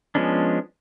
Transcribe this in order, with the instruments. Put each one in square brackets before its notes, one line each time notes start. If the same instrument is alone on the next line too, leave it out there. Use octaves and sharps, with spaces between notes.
[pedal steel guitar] F3 G#3 B3 C#4 D4